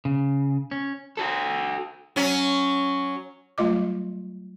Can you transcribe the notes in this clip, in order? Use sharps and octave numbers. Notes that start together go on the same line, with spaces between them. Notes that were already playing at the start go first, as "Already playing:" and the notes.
C#3
C#4
F#4 A4
F#3 C#4
F#3 G3 A3 F4 D#5 D6